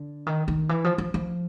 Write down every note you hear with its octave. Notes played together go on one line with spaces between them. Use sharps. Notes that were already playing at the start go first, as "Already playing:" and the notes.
Already playing: D3
D#3
D#3
E3
F3
F3
F3